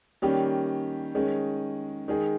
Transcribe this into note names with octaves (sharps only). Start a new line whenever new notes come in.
D#3 G3 A#3 C#4 G4
D#3 G#3 C#4
D#3 G#3 D#4 G#4